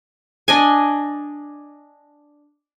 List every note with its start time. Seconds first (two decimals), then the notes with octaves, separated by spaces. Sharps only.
0.48 D4 D#5 G#5